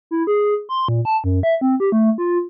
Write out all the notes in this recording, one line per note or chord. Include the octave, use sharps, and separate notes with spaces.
E4
G#4
C6
A#2
A5
F#2
E5
C4
G4
A3
F4